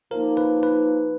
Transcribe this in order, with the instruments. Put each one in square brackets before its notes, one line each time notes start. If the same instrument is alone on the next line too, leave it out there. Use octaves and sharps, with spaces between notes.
[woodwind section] F3 A#3 D#4 [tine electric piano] A#4
[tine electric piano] B4
B4